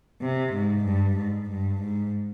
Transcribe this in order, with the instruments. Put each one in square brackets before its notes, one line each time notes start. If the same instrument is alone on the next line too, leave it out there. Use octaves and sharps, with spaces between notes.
[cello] C3
G#2
G2
G#2
G2
G#2